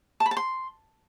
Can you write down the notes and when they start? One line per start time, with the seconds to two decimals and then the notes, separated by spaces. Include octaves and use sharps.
0.20 A5
0.26 B5
0.31 A5
0.37 C6